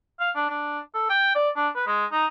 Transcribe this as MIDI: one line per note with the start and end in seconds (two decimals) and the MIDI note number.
0.20 0.31 77
0.36 0.45 62
0.50 0.79 62
0.94 1.05 69
1.10 1.33 79
1.35 1.50 74
1.57 1.68 62
1.75 1.87 71
1.87 2.06 56
2.12 2.26 63